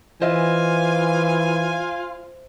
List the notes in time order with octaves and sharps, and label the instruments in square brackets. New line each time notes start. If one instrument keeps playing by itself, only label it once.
[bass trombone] E3 [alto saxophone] F4 [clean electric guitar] C5 D#5 E5 [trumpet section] G#5